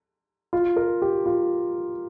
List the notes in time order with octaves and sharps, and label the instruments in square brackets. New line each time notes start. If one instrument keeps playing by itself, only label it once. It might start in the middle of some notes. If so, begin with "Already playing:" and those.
[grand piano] F4
A#4
G4
F4